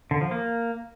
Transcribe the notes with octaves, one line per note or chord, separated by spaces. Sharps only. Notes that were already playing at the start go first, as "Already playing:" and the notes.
D3
F3
A#3